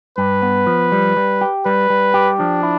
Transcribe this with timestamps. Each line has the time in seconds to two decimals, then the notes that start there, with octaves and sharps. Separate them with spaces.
0.18 G2 B4
0.42 B3
0.67 F3
0.92 G3
1.17 G3
1.41 G4
1.66 G3 B4
1.90 G3
2.14 G4
2.39 F3 D4
2.63 E4